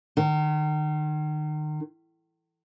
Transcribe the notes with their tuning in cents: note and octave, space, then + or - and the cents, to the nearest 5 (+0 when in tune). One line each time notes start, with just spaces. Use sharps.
D#3 -35